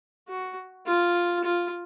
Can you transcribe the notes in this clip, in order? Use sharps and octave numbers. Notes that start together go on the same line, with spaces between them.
F#4
F4
F4